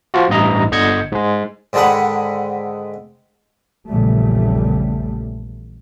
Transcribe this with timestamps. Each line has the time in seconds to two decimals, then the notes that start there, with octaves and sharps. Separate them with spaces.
0.14 F3 F4 F#4
0.29 A1 G2 E4 D#5 A#5
0.72 G1 D3 D#5 G6 G#6 C#7
1.12 G#2 G#3
1.73 G#2 D3 D#3 G#3 B4 F#5
3.88 A#1 E2 A#2 C#3 G3 A3